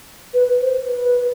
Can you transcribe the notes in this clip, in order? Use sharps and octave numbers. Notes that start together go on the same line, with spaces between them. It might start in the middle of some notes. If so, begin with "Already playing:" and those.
B4
C5
B4